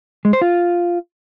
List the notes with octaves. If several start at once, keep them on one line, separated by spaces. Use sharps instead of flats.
G#3
C5
F4